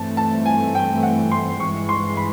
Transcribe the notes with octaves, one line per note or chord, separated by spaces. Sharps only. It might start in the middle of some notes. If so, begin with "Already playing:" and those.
Already playing: G2 E3 A3 C4 A5
A5
G#5
G5
F#5
C6
G2 E3 G#3 C#6
C6
B5